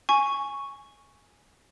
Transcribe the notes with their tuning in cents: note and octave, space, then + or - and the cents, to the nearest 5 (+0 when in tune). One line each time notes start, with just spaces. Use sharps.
G#5 +0 C#6 +0